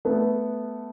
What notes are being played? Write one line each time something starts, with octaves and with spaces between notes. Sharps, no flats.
A3 B3